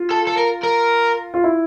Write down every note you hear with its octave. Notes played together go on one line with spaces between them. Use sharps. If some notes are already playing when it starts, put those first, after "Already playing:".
Already playing: F4
A4
A4
A#4
A#4
F4
E4